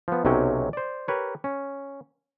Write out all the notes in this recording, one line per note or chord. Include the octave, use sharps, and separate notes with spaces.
F3 B3
B1 C3 F#3 C#4 G5
C5 D5
G4 A#4 B4 C#5
C#4